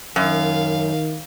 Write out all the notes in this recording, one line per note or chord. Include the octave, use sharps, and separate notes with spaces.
F#2 D#3 F5